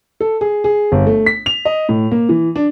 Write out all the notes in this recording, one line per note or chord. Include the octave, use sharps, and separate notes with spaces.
A4
G#4
G#4
G1
A3
B6
F7
D#5
A2
A#3
E3
D4